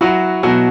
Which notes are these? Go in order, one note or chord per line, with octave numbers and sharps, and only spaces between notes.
F#3 E4 F#4
B2 F#3 F#4